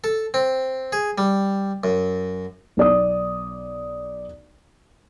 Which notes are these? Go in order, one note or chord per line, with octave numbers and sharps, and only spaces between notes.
A4
C4
G#4
G3
F#2
B1 D5 D#6